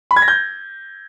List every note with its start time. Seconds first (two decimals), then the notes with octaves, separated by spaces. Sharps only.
0.11 B5
0.16 G#6
0.22 A#6
0.28 G6